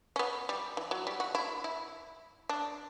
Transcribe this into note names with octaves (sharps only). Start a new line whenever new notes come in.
C#4
B3
G3
E3
F#3
G3
F#4
E4
E4
D4